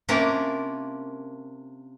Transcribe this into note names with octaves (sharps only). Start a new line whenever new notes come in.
C3 A#3 C#4 D4 F4 A#4